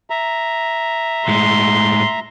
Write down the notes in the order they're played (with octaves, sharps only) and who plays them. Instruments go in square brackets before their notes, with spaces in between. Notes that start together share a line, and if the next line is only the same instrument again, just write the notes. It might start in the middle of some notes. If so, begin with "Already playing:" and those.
[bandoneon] E5 A#5
[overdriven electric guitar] A2 G#3 [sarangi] C6